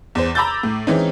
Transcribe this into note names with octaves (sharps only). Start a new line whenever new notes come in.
E2 C5
A#5 B5 D6 E6 G6 A6
A2
E3 G#3 C4 C#4 D#4